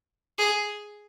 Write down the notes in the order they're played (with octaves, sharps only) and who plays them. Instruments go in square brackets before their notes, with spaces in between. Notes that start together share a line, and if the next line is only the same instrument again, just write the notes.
[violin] G#4